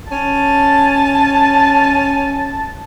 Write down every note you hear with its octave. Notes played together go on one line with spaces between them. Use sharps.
C#4 A5